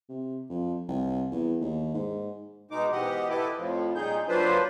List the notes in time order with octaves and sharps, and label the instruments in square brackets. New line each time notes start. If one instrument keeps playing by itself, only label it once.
[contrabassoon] C3
F2
C2
E2
D#2
G#2
[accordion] B2 G#3 D#4 D6
G#2 B2 E3 G4 D#5 F#5
E4 G4 A4 B4 D#5 D6
F2 A2 F3
A#2 G3 D#4 G#4 G6
F#3 A#3 D4 F4 B4 C5